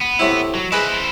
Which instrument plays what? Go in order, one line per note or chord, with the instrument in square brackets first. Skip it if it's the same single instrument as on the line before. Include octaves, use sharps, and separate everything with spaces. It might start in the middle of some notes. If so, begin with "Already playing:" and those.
[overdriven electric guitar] B3
[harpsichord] A2 C3 E4
[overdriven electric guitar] F#3
[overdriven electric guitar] E4 C5 [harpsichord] G#4 B4 D#5